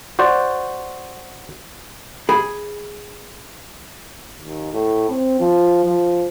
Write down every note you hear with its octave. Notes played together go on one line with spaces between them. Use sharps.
F#4 C5 D5
G#4 B5
D#2
A2
C4
F3
F3